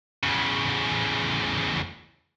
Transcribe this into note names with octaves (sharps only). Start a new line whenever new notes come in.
E2 C#3